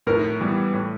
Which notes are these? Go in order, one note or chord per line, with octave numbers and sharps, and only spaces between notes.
A2 A#4
E3 G3 B3
A2